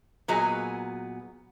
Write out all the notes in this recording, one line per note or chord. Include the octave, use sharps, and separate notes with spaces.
A#2 F#3 B3 G#4 D#5